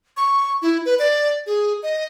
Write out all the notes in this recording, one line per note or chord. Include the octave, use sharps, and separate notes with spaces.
C#6
E4
B4
D5
G#4
D#5